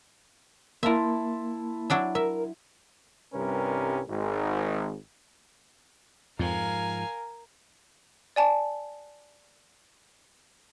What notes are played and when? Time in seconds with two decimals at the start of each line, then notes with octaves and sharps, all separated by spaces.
0.83 A#3 E4 A#4 E5 A5 C6
1.90 F#3 D4 E5
2.15 A#4 E5
3.34 C2 G2 C3 C#4 A#4 B4
4.09 G#1 G#2
6.39 F2 G#2 F3 A#4 F5 G#5
8.36 D5 G#5 A5